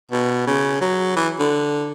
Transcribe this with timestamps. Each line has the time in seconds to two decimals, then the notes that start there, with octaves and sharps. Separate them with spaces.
0.11 B2
0.47 C#3
0.81 F#3
1.16 E3
1.39 D3